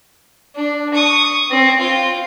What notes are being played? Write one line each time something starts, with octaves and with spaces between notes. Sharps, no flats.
D4
C#6 D#6
C4
F4 G5